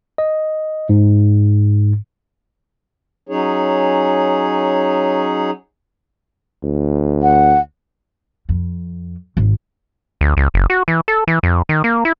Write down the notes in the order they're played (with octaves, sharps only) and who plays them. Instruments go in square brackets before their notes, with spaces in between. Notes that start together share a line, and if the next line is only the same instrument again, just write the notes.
[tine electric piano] D#5
G#2
[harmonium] F#3 C#4 D#4 G#4 C#5
[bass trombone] D2
[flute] F#5
[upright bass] F2
G#1
[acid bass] D2
C#2
F#1
F#4
E3
A4
E3
F2
D#3
A#3
E4